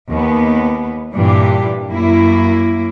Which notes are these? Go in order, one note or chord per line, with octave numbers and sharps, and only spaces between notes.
D#2 B3
G2 A#2 E3 D4 G4
F#2 A#3 E4